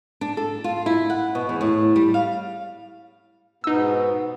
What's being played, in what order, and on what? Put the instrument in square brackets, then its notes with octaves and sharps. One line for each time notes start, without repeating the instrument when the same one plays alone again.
[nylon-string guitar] D4
A4
F4
E4
F#5
B2
E2
A2
G3
F5
[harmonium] G#2 B2 B3 [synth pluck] D#4 E6